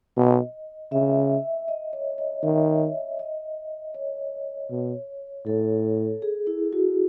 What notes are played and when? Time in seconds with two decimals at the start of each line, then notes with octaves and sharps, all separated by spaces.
0.16 B2 D#5
0.92 C#3 E5
1.68 D#5
1.93 C#5
2.18 D#5
2.43 D#3 E5
3.19 D#5
3.94 C#5
4.71 B2
5.46 A2 A4
6.22 G#4
6.47 E4
6.73 F#4